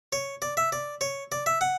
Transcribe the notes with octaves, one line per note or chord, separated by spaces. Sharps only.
C#5
D5
E5
D5
C#5
D5
E5
F#5